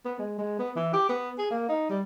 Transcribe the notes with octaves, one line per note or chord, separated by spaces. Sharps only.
B3
G#3
G#3
B3
E3
G4
B3
G#4
A#3
D#4
G3